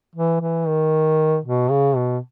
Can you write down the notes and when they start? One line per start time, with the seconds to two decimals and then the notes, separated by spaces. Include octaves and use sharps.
0.16 E3
0.41 E3
0.68 D#3
1.45 B2
1.70 C#3
1.96 B2